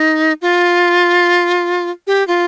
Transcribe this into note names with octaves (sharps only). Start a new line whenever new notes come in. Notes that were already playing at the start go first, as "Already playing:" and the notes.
Already playing: D#4
F4
G4
F4